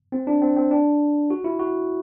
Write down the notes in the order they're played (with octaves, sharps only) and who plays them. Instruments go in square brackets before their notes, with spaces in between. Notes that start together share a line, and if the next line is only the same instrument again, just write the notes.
[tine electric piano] C4
D4
C4
C4
D4
F#4
E4
F#4